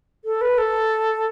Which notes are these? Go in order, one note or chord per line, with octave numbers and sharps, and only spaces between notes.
A4
B4
A4